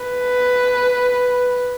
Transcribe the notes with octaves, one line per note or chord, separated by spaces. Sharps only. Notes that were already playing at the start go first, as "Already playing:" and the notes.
Already playing: B4